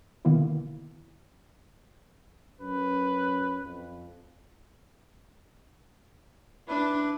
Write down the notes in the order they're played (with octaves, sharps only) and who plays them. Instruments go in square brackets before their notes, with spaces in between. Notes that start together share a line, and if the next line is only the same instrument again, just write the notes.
[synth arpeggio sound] B2 D3 D#3 A#3 B3 E4
[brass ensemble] F#2 C#4 [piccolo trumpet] B4
[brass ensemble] F2
[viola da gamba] D4 [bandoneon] E4 B4